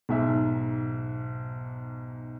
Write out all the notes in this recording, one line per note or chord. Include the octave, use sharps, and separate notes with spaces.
B1 G#2 E5